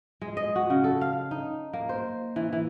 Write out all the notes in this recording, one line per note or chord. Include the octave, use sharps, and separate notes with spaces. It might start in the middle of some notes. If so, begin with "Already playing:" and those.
G#3
D#5
F#4
C#3
A4
F5
D#4
A#3
C5
E3
E3